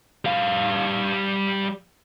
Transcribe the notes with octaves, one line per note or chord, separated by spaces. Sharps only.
G3 F5